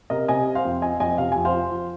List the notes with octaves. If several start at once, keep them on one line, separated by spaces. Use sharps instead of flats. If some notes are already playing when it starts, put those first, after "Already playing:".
C3 A#4 D#5
C3 D#5 G#5
C4
C5 F5
F2
C4 D#5 G#5
F2 D#5 G#5
C3 F5
F2 G#5
C5 F5
F3
F3